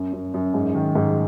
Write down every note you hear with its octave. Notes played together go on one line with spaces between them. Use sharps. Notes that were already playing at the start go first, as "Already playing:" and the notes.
Already playing: F#2
F#2
F#2
G#2
D#3
G#2